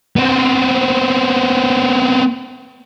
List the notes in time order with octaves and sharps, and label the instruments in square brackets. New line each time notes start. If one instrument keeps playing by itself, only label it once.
[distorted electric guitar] B3 C4